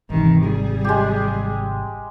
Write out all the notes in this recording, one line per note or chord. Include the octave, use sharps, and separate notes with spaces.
G#1 C3 D#3 E3
G3 G#4
G#3 G4